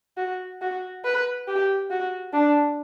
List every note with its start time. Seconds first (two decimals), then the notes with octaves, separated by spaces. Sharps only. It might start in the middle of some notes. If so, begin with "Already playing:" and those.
0.17 F#4
0.61 F#4
1.04 B4
1.47 G4
1.90 F#4
2.33 D4